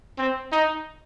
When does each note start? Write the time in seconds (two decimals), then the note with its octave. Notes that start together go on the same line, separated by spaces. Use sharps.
0.18 C4
0.52 D#4